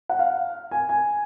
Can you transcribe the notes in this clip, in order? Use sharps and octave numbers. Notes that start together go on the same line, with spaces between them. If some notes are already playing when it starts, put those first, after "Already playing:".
F#5
F5
G#5
G#5